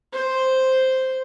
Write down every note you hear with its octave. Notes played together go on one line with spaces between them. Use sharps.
C5